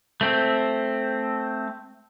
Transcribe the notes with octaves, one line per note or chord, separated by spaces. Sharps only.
A3 C4